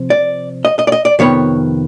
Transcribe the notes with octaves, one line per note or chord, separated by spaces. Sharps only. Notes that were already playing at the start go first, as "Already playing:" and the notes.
Already playing: C3 F3 C4
D5
D#5
D#5
D5
D#5
D5
F2 C3 D#3 B3 C#5